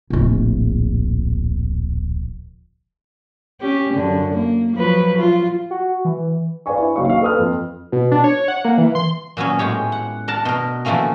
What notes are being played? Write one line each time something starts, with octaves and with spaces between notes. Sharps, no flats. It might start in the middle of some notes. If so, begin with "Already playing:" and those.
D1 A#1
C#4 G4
F#2 D3
A#3
F3 F#3 B4
F4
F#4
E3
B4 D5 F5 G#5 C#6
E4
F#1 F#3 D#4 C#5 F5 C#6
F5
A4 B4 D#6 F6
F2
B2
D4
C#5
F#5
A#3
E3
C6
A#2 F#3 B3 C#4
A2 G#3 G4 C#5
F#5
D4 A#4 F#5 A5
B2 A#4
D3 E3 F3 A3 A#3 C#4